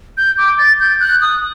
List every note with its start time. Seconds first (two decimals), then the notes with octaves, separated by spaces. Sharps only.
0.17 G6
0.38 D6
0.58 A6
0.80 G6
1.00 F#6
1.21 D#6